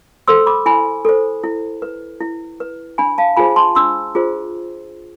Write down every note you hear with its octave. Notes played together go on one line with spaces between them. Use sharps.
A4 C5 C6 E6
B5 D6
E4 G#5 B5
A4 C5
E4
B4
E4
B4
D4 G#5 B5
F5 A5
F4 G#4 C5 G#5 B5
A5 C6
D4 C6 E6
F4 G#4 C5